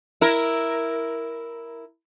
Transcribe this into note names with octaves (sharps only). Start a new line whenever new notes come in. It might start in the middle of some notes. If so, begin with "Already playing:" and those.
E4 A#4